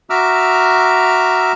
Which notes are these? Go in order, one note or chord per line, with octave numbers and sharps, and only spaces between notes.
F#4 E5 A#5 D6 E6 F6